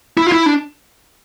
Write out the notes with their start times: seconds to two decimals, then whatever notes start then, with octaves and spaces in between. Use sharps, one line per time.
0.17 E4
0.27 F4
0.32 E4
0.46 D4